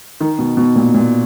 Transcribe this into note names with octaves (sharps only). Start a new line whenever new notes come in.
D#3
B2
B2
A#2
A#2